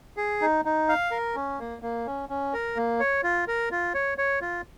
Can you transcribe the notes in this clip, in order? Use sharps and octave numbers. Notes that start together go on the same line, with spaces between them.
G#4
D#4
D#4
F5
A#4
C#4
A#3
A#3
C#4
C#4
A#4
A#3
C#5
F4
A#4
F4
C#5
C#5
F4